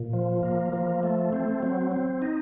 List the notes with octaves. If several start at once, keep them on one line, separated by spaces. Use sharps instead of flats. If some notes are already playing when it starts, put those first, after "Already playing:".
Already playing: A#2
F3
A#3
F3
A3
C4
F#3
C4
D#4